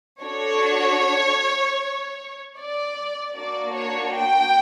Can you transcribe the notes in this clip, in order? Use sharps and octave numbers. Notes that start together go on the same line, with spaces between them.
D4 F#4 A4 C#5
D5
A#3 D4 F#4 D5
C#5
G5